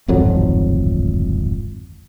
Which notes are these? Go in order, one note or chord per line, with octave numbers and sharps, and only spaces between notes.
D1 G#1 F2 F#3